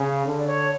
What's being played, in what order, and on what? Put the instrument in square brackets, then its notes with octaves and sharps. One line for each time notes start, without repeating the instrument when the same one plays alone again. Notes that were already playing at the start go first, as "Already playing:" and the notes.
Already playing: [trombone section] C#3
D3
[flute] D5
C#5